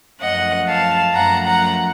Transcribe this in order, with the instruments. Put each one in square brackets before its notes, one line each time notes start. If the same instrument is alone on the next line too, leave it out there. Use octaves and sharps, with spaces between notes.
[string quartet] F#2 F3 A3 D#5 F#5
F5 A5
F#2 F3 A3 F#5 A#5
F#5 A#5